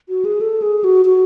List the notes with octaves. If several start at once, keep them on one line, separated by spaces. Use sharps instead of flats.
F#4
G#4
A4
G#4
F#4
F#4